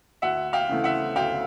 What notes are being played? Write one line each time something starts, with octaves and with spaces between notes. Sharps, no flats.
D2 E5 F#5
F5 G5
C#3 E3 A3 C4
E5 F#5
D2 F5 G5